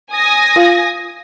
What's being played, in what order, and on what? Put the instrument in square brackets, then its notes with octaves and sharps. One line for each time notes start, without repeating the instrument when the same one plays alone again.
[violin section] G#5 D#6 A#6
[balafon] F4 F5